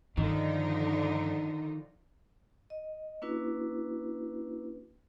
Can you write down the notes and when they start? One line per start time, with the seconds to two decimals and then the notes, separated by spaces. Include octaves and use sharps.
0.17 G2 D3 D#3 F3 D#4
2.70 D#5
3.22 A#3 C#4 D4 E4 F#4 B4